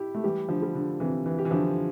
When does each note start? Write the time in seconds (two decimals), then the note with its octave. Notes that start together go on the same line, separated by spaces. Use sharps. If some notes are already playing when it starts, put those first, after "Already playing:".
Already playing: E4 G4
0.15 A3
0.23 E3 G3 G4
0.49 D3 F3
0.62 G3
0.75 D3
1.00 C3 E3
1.26 E3
1.38 G4
1.45 E3
1.51 D3 F3